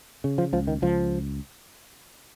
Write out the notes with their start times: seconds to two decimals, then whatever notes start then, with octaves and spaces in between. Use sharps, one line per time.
0.24 C#3
0.38 F3
0.53 C#2 F3
0.67 D#3
0.82 C#2 F3